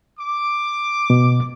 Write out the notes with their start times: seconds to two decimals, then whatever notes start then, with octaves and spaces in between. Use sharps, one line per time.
0.19 D6
1.10 B2